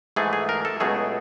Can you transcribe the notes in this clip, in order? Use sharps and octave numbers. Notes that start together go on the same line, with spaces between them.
G#2 E3 A3 G#4
G#4
A#4
A4
C#2 B2 F#3 A3 G#4